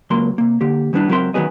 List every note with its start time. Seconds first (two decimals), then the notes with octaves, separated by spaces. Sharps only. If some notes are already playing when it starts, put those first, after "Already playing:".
0.10 C#2 F#3 A#3 C6
0.38 C3 A#3
0.61 D3 A#3 G4
0.93 D#3 G3 B3 C#4 D4 E4
1.09 C#2 F#3 C4 A#4 E5 C6
1.34 D#3 E3 F#3 B3 G#4 D#5